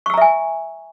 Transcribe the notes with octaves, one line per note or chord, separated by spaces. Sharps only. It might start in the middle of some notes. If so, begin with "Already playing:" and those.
E5 G#5 A#5 C#6 E6